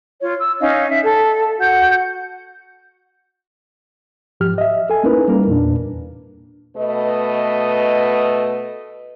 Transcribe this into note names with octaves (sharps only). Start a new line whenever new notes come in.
F4 C#5
E6
C#4 D#4 D#5 F5
E5
A4
F#4 F#5 G6
G#2 F3 G4 F6
D#5 E5
A4 G#5
A#3 C#4 D#4 E4 A#4 B4
G3 A#3 A#4 B4
E2 A#2 D4
B2 A3 B4 D#5